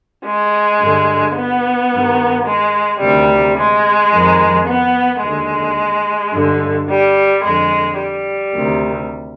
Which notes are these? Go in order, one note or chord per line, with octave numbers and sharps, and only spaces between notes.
G#3
G2 D3
B3
G2 D#3
G#3
D2 C3 D#3 G3
G#3
F2 D#3
B3
D#2 G#3
D3
G2 D3
G3
F2 D3 G#3
G3
D2 C3 D#3